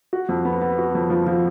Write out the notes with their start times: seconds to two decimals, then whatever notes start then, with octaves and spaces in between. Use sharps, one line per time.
0.13 F#4
0.29 F2
0.45 B3
0.61 B3
0.78 F#4
0.95 F2
1.10 F3
1.27 F3